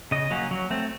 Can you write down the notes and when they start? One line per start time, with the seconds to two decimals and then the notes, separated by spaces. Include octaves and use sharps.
0.11 C#3 D#5
0.31 F#3 A#3 C#4
0.51 F#3
0.70 A3 C4